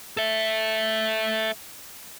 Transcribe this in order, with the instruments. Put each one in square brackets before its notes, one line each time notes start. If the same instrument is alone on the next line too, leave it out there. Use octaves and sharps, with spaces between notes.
[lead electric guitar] A4 E5